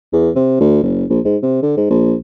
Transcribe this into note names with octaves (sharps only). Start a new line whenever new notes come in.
E2
C3
D2
F#1
A#1
G#2
C3
D3
G#2
A#1